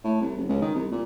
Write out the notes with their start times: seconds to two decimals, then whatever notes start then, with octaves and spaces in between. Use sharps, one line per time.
0.04 A2
0.21 C2
0.37 F#1
0.49 C#2
0.62 D#3
0.74 C2
0.91 A#2